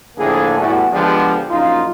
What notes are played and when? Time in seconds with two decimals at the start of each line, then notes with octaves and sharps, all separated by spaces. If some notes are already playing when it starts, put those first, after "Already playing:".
0.17 A2 D3 F3 A#3 G#4
0.58 E2 A2 E3 G3 F#4
0.92 D3 F3 G#3 B3 D4 G4
1.49 A#1 F#2 D#4 F4